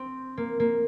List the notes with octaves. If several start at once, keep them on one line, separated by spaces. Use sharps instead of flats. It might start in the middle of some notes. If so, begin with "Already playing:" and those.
Already playing: C4
A#3
A#3